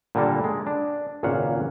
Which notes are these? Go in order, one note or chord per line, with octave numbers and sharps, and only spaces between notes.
A#2 D3 G3 A#3 A4
G#3
D4
G#1 C#2 A#2 C#4 F5 F#5